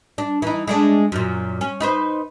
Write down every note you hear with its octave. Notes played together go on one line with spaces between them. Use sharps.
D4
E3 D#4
G#3 A3 D4
F#2 A#2
C#4
D#4 B4 C5